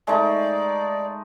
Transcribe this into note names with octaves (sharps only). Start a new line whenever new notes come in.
G#3 A3 D#4 D5